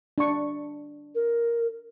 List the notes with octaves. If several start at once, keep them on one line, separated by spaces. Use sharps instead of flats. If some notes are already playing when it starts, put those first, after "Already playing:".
D4 C#6
A#4